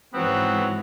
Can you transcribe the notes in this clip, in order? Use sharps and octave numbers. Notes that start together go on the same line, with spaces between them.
G#2 E3 F#3 G#3 B3 C4